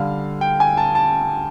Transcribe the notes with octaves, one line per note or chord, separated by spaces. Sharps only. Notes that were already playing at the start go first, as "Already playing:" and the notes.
Already playing: D3 G3 F5
G5
G#5
A5
A5